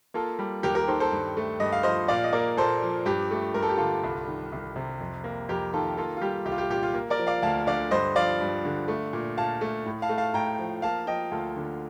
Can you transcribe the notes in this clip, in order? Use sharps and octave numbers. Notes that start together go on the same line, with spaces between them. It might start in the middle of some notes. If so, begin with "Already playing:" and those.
A#3 F4 A4
G3
D#2 G4 A#4
G4 A#4
D#3 A4 C5
A4 C5
G2
A3
G2 D#5
F5
F3 C5 D#5
A#2 D5 F5
D#5
A#3 A#4 D5
A#2 A4 C5
F3
G2 G4
A3
G2 A#4
A4
G4
D3 F4 A4
C2
D#3
C2
C3
F2
A#3
F2 G4 A#4
D#3 F4 A4
A#3 F4 A4
F4
G3 G4
C2 G4
F4
G4
A#2 G4
F4
A#3
A#4 D5
F3
D5 F5
D2 F5 A5
D3 D5 F5
G2 C5 D#5
F3 D5 F5
G2
D3
A3
A#2
A#2 F5 A5
A3
A2
F5 A5
A3
F5 A5
A2 G5 A#5
F3
A#3 F5 A5
F3 D#5 G5
D2 F4 A4
D3